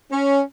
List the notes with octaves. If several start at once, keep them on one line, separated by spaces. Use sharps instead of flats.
C#4